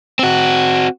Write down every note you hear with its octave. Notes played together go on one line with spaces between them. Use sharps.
C4 F#4